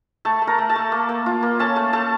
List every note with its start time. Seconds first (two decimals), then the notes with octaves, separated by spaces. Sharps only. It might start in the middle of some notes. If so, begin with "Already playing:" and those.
0.25 A3 A4 A5
0.42 A3
0.47 A#4 A#5
0.58 A3
0.69 A4 A5
0.76 A3
0.92 A#3
1.09 A#3
1.26 F4
1.43 A#3
1.59 C#4 A4 A5
1.76 A3
1.93 A3 A4 A5